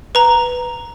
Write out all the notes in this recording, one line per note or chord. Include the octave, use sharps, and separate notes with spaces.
B4 A#5